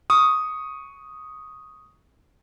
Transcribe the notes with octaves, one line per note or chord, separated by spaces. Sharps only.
C#6 D#6